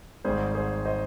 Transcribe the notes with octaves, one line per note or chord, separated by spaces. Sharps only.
G#1 G#2 G3 G#4 C5
G#4 C5
C5 D#5